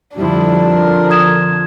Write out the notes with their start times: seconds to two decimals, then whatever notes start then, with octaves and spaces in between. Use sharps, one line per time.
0.17 F2 D3 F3 G3 D4 E4
0.69 A#4
1.10 D#6 G#6 E7